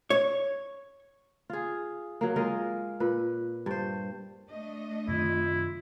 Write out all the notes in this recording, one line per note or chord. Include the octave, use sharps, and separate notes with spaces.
C#5
F4 G#4
F#3 A#3
G#3 F4 A#4 D#5
A#2 B4
G2 C5
A3 D4 D#5
F#2 C3 D#3 E4 F4